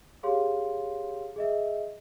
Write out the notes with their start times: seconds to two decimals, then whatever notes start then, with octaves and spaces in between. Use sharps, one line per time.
0.23 G4 G#4 C#5 F5 C6
1.36 G#4 D#5 E5